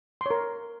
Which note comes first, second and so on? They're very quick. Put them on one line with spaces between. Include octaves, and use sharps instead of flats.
C6 C#5 A#4